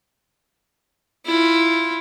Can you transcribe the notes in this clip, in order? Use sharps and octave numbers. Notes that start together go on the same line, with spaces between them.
E4 F4